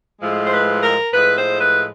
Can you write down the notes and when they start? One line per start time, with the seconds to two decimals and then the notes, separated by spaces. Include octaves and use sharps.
0.21 A2 F3 G#3
0.45 C5
0.52 B4
0.83 A#4
1.14 A2 F3 G#3 B4
1.37 C5
1.60 B4